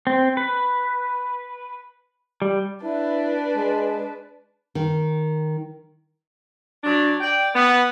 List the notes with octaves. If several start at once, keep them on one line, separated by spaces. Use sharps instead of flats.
C4
B4
G3
D4 E4 B4
G#3
D#3
F#3 D4
D5 G5
B3